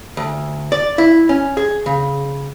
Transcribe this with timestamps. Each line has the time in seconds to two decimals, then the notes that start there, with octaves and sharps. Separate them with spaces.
0.17 D2
0.72 D5
0.98 E4
1.29 C#4
1.57 G#4
1.86 C#3